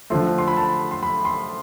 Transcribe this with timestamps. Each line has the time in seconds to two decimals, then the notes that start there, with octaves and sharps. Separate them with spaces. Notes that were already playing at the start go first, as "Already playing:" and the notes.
0.10 D3 F3 A3 C6
0.38 C6
0.48 B5
0.57 A5
0.91 C6
1.03 B5
1.25 C6